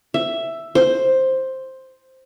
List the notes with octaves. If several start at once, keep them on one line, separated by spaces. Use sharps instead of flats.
E5
C5